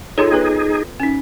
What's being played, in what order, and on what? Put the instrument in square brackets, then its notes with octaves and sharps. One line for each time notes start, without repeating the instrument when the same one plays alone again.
[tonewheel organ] D#4 G#4 [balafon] F4 A4 C#5
[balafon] B3 B4
C#4 D#4